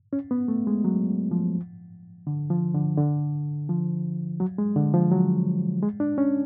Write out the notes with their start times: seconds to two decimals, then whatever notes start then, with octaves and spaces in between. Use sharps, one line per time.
0.13 C#4
0.31 B3
0.48 A3
0.67 G#3
0.84 F#3
1.31 F3
2.27 D3
2.50 F3
2.75 D3
2.97 D3
3.69 F3
4.40 F#3
4.58 G#3
4.76 D3
4.94 F3
5.12 F#3
5.82 G#3
6.00 D4
6.18 C#4